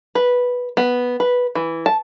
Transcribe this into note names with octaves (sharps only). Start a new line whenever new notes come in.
B4
B3
B4
E3
A5